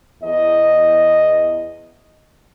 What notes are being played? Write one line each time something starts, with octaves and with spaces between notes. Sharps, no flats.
E2 D#5